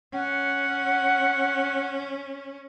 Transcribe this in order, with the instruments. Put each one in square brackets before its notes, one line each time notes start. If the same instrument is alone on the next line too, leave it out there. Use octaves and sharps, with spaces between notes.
[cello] C#4 [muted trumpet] F#5